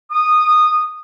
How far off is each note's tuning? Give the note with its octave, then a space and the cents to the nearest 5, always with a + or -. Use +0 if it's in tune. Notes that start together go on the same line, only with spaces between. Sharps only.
D#6 -15